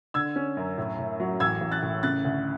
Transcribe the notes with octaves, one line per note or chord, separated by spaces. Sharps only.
D3 E6 G#6
C#4
F#2
A2
A2
F#3
A1 E6 G#6
A1
F#6 A6
A2
C#3 F#6 A6
D2